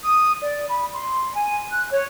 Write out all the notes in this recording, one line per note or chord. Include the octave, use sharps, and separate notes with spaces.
D#6
D5
B5
C6
G#5
F#6
C#5